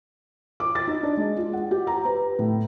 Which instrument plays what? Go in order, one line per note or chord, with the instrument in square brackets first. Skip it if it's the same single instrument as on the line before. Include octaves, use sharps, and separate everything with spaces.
[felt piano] D6
A6
D#4
D4
G#3
F4
F#5
G4
A#5
B4
A2